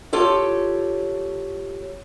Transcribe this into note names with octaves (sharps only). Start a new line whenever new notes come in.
F4 G4 A4 C#5